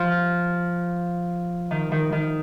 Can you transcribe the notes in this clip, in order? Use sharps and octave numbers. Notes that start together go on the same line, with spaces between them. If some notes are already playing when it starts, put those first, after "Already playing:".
Already playing: F3
D#3
D#3
D#3